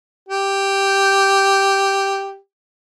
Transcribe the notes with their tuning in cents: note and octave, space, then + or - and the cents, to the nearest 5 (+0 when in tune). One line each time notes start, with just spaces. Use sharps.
G4 +0